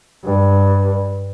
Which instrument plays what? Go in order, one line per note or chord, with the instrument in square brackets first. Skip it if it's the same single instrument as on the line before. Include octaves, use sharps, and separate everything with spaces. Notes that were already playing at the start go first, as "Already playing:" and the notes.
[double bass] G2